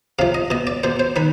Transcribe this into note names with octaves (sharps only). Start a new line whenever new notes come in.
C3 F3 F5
D#5
B2 D#5
D5
B2 C5
C5
D#3 B4